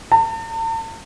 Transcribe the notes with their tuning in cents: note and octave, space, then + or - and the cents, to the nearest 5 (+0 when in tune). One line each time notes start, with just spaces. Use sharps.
A5 +45